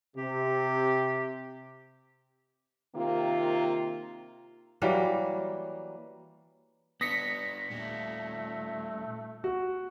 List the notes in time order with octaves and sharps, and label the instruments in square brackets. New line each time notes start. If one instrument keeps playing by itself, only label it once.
[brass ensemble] C3 [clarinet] G4
[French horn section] C3 D#3 A#3 F4
[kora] E3 F#3 G3 A#3
[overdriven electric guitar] B3 D4 [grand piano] D#6 [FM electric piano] A#6 B6 C#7
[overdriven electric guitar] A#2 G3 [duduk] A3
[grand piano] F#4